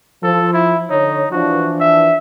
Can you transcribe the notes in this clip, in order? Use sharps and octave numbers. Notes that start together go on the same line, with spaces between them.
F3 A4
E4
D3 D#4 C#5
E3 F3 D4 F#4
E5